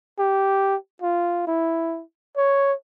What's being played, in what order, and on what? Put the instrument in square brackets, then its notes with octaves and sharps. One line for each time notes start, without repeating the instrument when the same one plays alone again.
[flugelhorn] G4
F4
E4
C#5